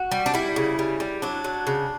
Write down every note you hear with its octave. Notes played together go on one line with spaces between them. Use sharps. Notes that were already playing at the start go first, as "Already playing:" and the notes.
Already playing: F#4
G3
D4
G3 E4
C#3
G3
G3
F#3 D4
F#3
C#3